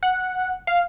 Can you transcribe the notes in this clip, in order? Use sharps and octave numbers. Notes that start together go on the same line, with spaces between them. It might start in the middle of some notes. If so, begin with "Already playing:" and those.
F#5
F5